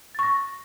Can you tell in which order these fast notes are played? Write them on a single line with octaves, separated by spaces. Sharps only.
A6 C#6 A#6